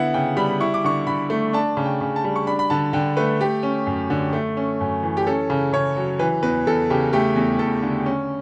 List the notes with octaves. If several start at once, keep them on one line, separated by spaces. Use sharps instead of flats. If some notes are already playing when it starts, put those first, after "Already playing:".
Already playing: D3 B3 E4 F#5
C#3 G5
G3 B5
E4 C#6
D6
D3 C#6
D3 B5
A3
D4 A5
C#3
G5
C#3
A5
G3
C#6
D4 B5
B5
D3 A5
D3 G5
A3 B4
A3 G4
C#4
F#2
D3
A3
C#4
F#2
E3
G4
C#4 A4
C#3
C#3 C#5
F#3
E3 B4
E2 B4
E2 A4
C#3 G4
A3 G4
E2
E2 A4
D3
C#4